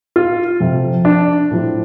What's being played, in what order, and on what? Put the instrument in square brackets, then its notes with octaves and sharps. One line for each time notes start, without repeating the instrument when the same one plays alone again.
[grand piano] F4
F2 C3 F3
D4
A2 F3